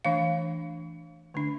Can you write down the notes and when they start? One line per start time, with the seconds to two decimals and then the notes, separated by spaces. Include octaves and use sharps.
0.05 E3 A3 D4 F5
1.34 D3 A3 D4